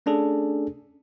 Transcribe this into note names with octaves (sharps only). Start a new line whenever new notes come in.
A3 C#4 D4 G#4 A4